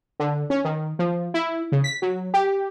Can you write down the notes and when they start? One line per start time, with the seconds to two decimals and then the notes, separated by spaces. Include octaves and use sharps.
0.20 D3
0.50 C#4
0.65 D#3
0.99 F3
1.34 E4
1.72 C#3
1.84 B6
2.02 F#3
2.34 G4